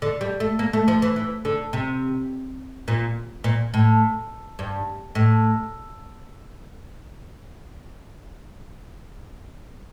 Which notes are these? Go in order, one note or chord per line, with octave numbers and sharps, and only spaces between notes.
D3
G3
A3
A#3
A3
F3
E3
E3
D3
C3
A#2
A#2
A2
G2
A2